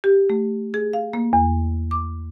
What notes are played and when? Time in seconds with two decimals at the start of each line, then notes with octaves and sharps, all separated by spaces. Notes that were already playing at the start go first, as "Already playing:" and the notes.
0.04 G4
0.30 A3
0.74 G#4
0.93 F5
1.13 A#3
1.33 E2
1.91 D6